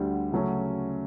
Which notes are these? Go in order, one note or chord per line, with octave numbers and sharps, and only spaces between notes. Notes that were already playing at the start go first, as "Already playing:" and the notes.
Already playing: D2 D3 G3
C#3 F#3 A3 C#4